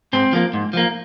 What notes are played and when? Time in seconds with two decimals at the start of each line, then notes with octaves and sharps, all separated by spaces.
0.13 G#2 C4
0.33 F3 A#3
0.54 G#2
0.73 F3 A#3